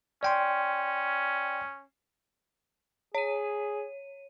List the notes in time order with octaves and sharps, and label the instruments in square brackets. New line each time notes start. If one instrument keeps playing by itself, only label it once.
[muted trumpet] C#4 [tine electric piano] D5 G5 C6
[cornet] G#4 [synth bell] C#5 D#7